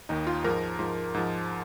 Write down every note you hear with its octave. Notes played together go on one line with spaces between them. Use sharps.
D#2 D#3 D#4
F4
G#2 F3 A#4
G#2 F3
G#2 F3